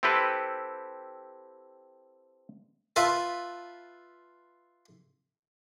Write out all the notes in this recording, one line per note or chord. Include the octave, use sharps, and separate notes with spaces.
C4 E4 G4 A4 B4
F4 B4 E5 A5